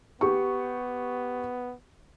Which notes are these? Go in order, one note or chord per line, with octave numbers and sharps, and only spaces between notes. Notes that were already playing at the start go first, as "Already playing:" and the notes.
B3 G4 C#6